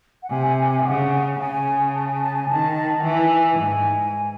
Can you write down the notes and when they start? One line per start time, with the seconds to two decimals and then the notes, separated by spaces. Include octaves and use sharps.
0.23 F#5
0.30 C3 G#5
0.48 G#5
0.67 G#5
0.78 E5
0.85 C#3 F#5
1.39 C#3 G#5
1.95 A5
2.08 G#5
2.23 A5
2.36 G#5
2.50 D#3 A5
2.99 F#5
3.04 E3 G#5
3.60 G#2